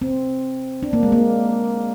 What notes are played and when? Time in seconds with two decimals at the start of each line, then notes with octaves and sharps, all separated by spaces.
0.02 C4
0.83 D4
0.93 A#3
1.03 G#3
1.12 A#3